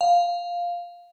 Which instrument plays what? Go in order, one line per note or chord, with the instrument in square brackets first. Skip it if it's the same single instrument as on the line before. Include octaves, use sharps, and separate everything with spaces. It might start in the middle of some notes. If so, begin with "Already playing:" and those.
[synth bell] F5